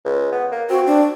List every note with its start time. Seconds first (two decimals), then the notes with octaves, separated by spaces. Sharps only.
0.05 C#2
0.32 B3
0.52 A#3
0.70 C4 F#4
0.87 D4